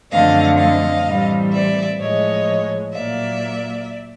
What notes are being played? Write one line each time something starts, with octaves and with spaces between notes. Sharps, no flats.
F#2 D3 F3 A3 C4 D#5 F5
D#5 F5
A2 E3 G3 C4
D5 E5
A2 F3 G#3 C#5 D#5
A#2 F#3 A#3 D5 E5